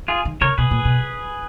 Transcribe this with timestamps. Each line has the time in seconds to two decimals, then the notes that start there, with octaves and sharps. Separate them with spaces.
0.08 F4 G#4
0.25 D#3
0.41 C#3 A#4 C#5
0.58 B2 G#4 B4
0.71 A#2
0.85 B2